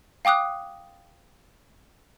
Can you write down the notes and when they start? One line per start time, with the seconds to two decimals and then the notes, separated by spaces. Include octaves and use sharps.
0.25 F5 G5 D6 D#6 F#6